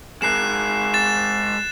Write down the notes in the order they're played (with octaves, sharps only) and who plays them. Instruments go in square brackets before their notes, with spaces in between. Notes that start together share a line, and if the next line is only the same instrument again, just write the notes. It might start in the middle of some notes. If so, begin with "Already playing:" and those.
[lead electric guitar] G#3 A#4 [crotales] F#6 C7 E7
[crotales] A6 E7